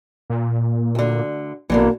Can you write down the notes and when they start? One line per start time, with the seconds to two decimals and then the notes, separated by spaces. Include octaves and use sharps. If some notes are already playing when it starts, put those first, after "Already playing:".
0.30 A#2
0.95 D2 D3
1.70 A#1 B2 D3 E3 A#3